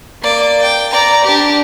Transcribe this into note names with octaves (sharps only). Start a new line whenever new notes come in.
A#3 D5
G5
D5 A#5
D4 G4